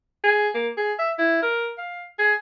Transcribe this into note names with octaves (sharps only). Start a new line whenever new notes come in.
G#4
A#3
G#4
E5
E4
A#4
F5
G#4